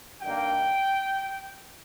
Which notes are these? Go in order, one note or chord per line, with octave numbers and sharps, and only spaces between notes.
G2 D#3 G3 A#3 G5